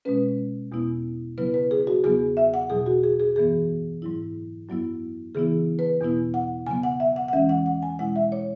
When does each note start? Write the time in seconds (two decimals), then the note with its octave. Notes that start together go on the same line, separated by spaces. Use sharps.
0.05 B2 G#3 C#4 B4
0.72 E2 B2 B3 E4
1.38 C#3 F#3 B3 E4 B4
1.54 B4
1.71 G#4
1.87 F#4
2.04 E2 C#3 F#3 B3 G#4
2.37 E5
2.54 F#5
2.70 E2 B2 F#3 G#4
2.86 F#4
3.04 G#4
3.20 G#4
3.36 F#2 E3 B3 G#4
4.02 G#2 F#3 E4
4.68 F#2 F#3 B3 E4
5.35 C#3 E3 B3 E4 G#4
5.79 B4
6.01 E2 B2 B3 E4
6.34 F#5
6.67 C#3 F#3 B3 G#5
6.83 F#5
7.00 E5
7.16 F#5
7.28 F#5
7.33 E2 E3 G#3 C#4 E5
7.49 F#5
7.66 F#5
7.83 G#5
7.99 B2 G#3 E4 F#5
8.16 E5
8.32 C#5